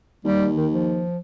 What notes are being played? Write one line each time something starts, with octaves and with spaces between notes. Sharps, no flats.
D#2 G3
D#3
F3